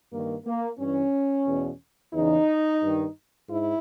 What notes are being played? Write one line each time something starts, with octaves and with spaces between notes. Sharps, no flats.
G2 D#3 A#3
A#3
G2 E3 C#4
E2 B2
E2 C#3 E3 D#4
G2
D#3
G#2 E4